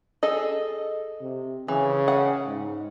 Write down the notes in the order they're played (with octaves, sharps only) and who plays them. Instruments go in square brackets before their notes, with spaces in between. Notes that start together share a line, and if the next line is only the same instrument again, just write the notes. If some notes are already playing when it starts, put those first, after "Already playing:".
[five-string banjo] G#4 A4 D#5
[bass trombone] C3
[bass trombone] C#3 [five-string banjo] E3
[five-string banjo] F#5
[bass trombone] G#2